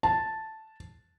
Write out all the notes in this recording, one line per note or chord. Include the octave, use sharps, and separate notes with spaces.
A5